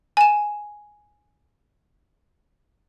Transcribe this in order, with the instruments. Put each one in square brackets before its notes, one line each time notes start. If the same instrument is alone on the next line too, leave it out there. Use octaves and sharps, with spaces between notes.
[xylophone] G#5 E7